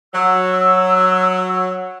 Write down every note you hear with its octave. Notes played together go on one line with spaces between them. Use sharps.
F#3 E6